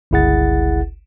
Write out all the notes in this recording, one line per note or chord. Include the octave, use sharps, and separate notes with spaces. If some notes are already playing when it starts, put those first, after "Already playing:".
G1 C#2 E4 G#4 F#5 A6